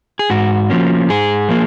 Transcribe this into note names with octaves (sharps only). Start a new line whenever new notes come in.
G#4
G#2 F#4
F3 A#3 C#4
G#2 G#4
F3 A#3